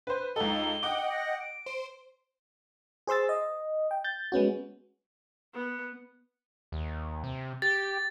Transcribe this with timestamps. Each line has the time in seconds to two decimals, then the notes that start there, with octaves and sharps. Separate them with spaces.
0.07 B4 C5
0.36 C#2 D#4 A4 G7
0.83 D#5 F#5 G5 D6
1.11 A#6
1.40 D7
1.66 C5
3.07 G#4 C5 C6 E6 A6
3.29 D#5
3.91 G5
4.04 G6 A6
4.32 G#3 B3 C#4 F#4
5.54 B3
6.72 D#2
7.24 C3
7.62 G4 A6